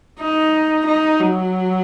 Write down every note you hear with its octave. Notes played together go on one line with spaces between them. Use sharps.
D#4
D#4
F#3